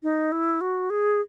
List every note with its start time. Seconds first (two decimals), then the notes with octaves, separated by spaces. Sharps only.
0.03 D#4
0.32 E4
0.61 F#4
0.90 G#4